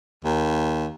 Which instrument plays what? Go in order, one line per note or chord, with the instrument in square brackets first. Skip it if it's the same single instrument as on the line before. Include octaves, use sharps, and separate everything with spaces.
[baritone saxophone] D#2